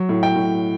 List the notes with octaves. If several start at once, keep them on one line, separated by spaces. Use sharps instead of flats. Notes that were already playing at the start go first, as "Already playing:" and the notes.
Already playing: F#3
A2
G5
A2